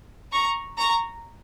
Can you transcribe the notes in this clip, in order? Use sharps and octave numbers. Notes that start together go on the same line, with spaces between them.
A#5 C#6
A#5 C#6